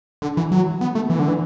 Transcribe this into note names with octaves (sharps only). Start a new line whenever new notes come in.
D3
E3
F#3
B3
A3
E3
D3
E3